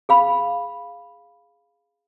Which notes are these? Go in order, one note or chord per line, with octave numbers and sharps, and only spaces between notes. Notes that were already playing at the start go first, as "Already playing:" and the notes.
G#4 F5 B5